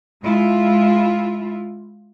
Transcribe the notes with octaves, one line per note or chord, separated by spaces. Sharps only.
G#3 E4 F4